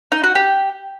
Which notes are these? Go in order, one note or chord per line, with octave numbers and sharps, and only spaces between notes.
D#4
F#4
G4